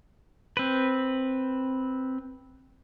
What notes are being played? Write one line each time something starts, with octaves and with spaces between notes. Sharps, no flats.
C4 B4